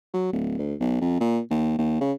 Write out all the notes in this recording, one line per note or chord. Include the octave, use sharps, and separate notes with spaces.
F#3
D1
D2
B1
F2
A#2
D#2
D#2
C#3